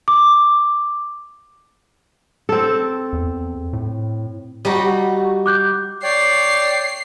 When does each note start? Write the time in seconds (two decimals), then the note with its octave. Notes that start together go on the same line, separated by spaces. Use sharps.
0.08 D6
2.49 C4 A4
3.13 E2
3.73 A2
4.65 G3 D#4 F#4
5.46 D6 F#6 G6
6.03 C#5 D5 G5 C7